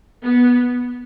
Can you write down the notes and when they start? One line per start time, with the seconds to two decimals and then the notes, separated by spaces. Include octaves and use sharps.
0.22 B3